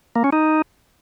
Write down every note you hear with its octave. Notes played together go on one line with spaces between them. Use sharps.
A#3
C#4
D#4